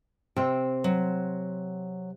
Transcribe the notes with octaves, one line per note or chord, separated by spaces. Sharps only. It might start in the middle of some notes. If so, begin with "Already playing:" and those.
C3 C4 G5
F#3